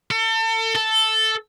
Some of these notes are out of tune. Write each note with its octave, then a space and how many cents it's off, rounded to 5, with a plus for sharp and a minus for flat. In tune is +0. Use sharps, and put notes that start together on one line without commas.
A4 +35
A4 +0